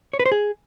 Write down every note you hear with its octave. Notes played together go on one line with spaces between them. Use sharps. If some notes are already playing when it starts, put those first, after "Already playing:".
C#5
B4
C5
G#4